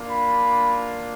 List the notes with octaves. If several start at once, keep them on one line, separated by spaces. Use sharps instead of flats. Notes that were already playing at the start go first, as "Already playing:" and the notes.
Already playing: A#3 D4 F4
B5